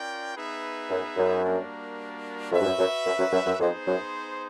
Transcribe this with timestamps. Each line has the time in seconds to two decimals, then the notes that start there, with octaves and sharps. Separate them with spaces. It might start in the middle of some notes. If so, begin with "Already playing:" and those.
Already playing: C#4 F4 A#4 D5 G5
0.36 B3 D#4 G#4 B4 E5
0.90 F#2
1.16 F#2
1.44 G3 A#3 D4 F#4 A#4
2.51 F2 F#4 B4 E5
2.60 G2
2.65 F#2
2.78 F#2
3.06 F#2
3.18 F#2
3.33 F#2
3.46 F#2
3.59 F2 B3 D#4 G#4 C5
3.86 F#2